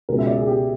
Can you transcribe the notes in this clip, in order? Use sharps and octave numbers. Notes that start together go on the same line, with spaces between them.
C#2 B2 G#3 A#4
E5
D5
G#4
G4